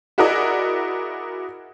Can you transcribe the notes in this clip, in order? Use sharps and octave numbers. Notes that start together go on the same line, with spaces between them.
E4 F#4 G#4 A#4 D5 D#5